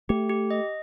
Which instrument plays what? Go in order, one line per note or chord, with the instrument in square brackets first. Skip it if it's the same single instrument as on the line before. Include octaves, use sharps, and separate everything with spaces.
[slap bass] A3 [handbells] G4
[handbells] G4
D#5